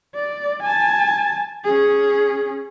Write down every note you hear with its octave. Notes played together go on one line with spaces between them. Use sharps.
D5
G#5 A5
C#4 G#4